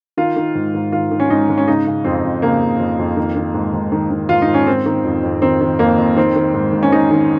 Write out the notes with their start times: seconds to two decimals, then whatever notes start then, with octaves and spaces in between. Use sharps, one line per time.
0.17 D#3 F4
0.36 D#3
0.55 G#2
0.75 G#2
0.92 D#3 F4
1.11 D#3
1.20 C#4
1.30 G#2 D#4
1.49 G#2
1.58 C#4
1.67 C#3 D#4
1.87 C#3
2.04 F2 C4
2.24 F2
2.42 C#3 A#3
2.61 C#3
2.80 F2
2.99 F2
3.17 D#3
3.36 D#3
3.54 G#2
3.74 G#2
3.92 D#3
4.11 D#3
4.29 G#2 F4
4.42 D#4
4.48 G#2
4.54 C#4
4.67 D#3 C4
4.86 D#3
5.04 F2
5.23 F2
5.42 D#3 C4
5.61 D#3
5.79 F2 A#3
5.98 F2
6.17 D#3 C4
6.36 D#3
6.54 G#2
6.73 G#2
6.83 C#4
6.92 D#3 D#4
7.11 D#3